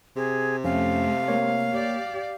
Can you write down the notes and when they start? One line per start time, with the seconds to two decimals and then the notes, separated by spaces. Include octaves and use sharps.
0.16 C3 G#4
0.64 F2 A3 C#4 F5
1.28 A#3 C#5
1.73 G4 D5